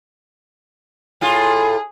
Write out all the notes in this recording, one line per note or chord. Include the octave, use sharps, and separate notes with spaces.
A2 F4 G#4